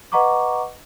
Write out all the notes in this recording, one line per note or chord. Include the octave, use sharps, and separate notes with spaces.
B4 D#5 F#5 A#5 C#6 D6